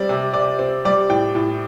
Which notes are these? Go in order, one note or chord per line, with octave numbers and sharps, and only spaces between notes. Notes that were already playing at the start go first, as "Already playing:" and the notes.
Already playing: G3 C4 D5
C3
C3 D5
C4
G3 D5
A2 G5
A2